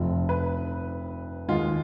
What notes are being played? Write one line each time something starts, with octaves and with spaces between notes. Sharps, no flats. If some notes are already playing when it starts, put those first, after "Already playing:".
Already playing: F1 F2 F3
B4
D#2 D#3 G#3 F4